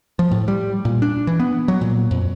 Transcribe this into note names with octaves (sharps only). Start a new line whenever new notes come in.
F3
A2
G3
A#2
D4
E3
B3
F#3
A#2
F2